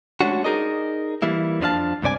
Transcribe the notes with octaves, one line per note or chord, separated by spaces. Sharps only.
G#3 A3 C#4 D4 F#4
D#4 G4 G#4 A#4 D5 D#5
E3 G3 A#3 E4
F2 F3 D4 G4 F5 A5
C#2 G2 C3 D5 G#5